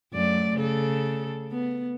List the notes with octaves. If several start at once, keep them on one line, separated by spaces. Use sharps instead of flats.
F#2 A3 D5
C#3 A4
B3